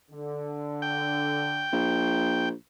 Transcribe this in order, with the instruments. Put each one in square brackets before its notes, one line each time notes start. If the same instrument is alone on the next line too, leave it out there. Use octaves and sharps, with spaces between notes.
[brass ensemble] D3
[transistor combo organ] G5
[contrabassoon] A#1